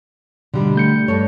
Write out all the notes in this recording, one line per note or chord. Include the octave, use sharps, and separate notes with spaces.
B2 D3 G3 G#3
A3 G6 C#7
G2 A4 C#5